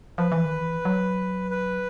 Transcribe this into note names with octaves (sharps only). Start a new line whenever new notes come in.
F3 B4
E3
D#3
E3
F#3
B4